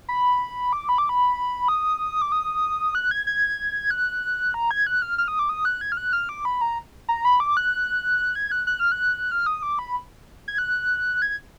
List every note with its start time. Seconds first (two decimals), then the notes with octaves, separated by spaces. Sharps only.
0.09 B5
0.73 D6
0.89 B5
0.98 D6
1.09 B5
1.68 D#6
2.22 D6
2.32 D#6
2.95 F#6
3.11 G#6
3.27 G#6
3.91 F#6
4.54 A#5
4.71 G#6
4.87 F#6
5.02 F6
5.18 F6
5.28 D#6
5.39 D6
5.49 D#6
5.65 F#6
5.81 G#6
5.92 F6
5.97 F#6
6.13 F6
6.29 D6
6.45 B5
6.61 A#5
7.09 A#5
7.25 B5
7.40 D6
7.57 F#6
8.35 G#6
8.52 F#6
8.67 F#6
8.80 F6
8.92 F#6
9.31 F6
9.46 D#6
9.63 D6
9.79 B5
10.48 G#6
10.58 F#6
11.22 G#6